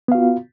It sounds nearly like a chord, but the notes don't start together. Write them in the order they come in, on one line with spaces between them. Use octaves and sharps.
B3 F5 F#4 F4